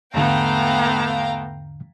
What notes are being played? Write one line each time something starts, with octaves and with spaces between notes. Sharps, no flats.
E2 G#2 D3 A3 B3 F5 G5 A#5